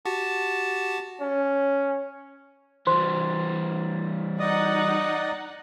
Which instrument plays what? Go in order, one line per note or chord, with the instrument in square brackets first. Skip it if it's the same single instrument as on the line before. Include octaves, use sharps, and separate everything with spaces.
[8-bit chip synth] F#4 G4 F#5 [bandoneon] A5
[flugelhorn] C#4
[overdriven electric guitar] E3 G3 [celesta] C5 C6
[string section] D#4 F#5 [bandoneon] D5 D#5 D#6